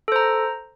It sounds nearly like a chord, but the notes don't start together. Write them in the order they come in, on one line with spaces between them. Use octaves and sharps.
A4 C5 A#5